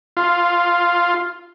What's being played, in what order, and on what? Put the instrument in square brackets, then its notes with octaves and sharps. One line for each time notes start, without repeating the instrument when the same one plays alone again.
[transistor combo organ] F4